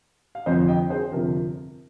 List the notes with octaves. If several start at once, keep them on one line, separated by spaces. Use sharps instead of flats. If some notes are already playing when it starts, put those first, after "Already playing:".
F5
G1 F2 C3 F3 C5 D#5
D#5 G5
G#4 C5
G1 F2 C3 F3 A#4